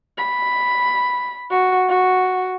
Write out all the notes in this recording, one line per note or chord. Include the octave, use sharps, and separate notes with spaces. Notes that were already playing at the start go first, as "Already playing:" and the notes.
B5
F#4
F#4